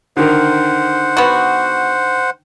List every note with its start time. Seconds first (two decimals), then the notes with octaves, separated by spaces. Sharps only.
0.17 D3 D#3 A#4 C5 F#5
1.17 B3 F#4